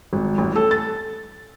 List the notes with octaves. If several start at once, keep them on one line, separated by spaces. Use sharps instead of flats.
G#1
A1
A4
A6